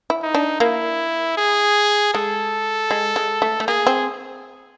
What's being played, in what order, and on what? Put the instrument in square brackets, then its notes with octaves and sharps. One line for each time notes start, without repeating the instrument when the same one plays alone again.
[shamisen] E4
[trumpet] D#4
[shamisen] D4
[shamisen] A#3 [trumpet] E4
[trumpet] G#4
[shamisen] G#3 [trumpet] A4
[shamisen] G#3
G#3
A3
A3
[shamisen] A#3 [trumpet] G#4
[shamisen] C4